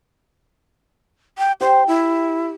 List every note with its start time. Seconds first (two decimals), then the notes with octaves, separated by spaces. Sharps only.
1.38 G5
1.61 G4 C5 G5
1.87 E4